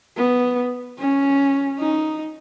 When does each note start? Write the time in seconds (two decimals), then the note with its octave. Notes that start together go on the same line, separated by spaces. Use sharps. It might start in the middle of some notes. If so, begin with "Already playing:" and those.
0.17 B3
0.98 C#4
1.79 D#4